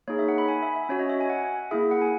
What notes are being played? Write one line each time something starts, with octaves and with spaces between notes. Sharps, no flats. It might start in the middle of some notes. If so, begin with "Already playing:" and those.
A#3 D#4 G#4 C#5
E5
F#5
B5
G#5
E5
E5
C#4 F#4 C#5
D#5
E5
G#5
F#5
A#3 E4 G#4 E5
F#5
G#5